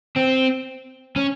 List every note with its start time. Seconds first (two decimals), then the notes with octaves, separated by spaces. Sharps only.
0.16 C4
1.16 C#4